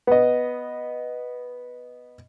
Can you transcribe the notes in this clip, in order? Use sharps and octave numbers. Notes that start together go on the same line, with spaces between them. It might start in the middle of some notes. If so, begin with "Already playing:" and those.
B3 D#5